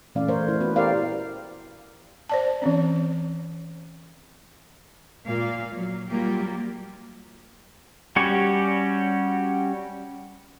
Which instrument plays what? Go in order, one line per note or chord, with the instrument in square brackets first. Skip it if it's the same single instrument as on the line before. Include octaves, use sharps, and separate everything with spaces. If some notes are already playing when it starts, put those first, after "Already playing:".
[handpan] A#2 E3 A3 C#4 D5 F5
A3 A#4 C5 C#5
E4
B3 F#4 B4
E4 G4 A#4 C5 D5 F5
[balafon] C5 D5 A5
E3 C4 C#4
[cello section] A#2 A#3 F5
F#3
F#3 G3 A#3 F4 G4
[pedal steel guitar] G3 C#4 F#4 G4 C#5